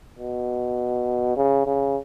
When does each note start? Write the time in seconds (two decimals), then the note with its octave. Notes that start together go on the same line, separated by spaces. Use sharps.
0.19 B2
1.36 C#3
1.66 C#3